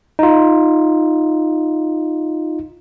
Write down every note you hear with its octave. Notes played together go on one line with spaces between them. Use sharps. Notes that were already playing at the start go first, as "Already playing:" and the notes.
D#4 F4